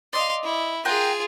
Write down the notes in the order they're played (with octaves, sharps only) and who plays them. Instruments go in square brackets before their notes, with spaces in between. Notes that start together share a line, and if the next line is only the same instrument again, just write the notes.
[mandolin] D5 D#5 [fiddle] F5 C6
[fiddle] E4
[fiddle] F4 G#4 [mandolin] A#4 F#5 G5